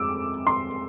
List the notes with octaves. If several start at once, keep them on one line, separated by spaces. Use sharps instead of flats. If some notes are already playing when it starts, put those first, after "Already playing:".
Already playing: F2 G#3 D6 E6
C6